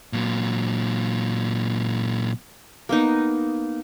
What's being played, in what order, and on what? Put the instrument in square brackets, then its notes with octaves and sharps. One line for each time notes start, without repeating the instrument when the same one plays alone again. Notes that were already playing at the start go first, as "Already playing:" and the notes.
[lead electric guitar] A#2 F#3
[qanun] A#3 B3 D#4